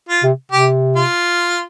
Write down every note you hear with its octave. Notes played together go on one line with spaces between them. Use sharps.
F4
C3
C3 G4
F4